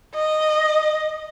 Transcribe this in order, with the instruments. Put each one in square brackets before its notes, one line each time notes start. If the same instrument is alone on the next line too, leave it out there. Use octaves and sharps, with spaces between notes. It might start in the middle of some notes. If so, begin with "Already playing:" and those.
[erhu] D#5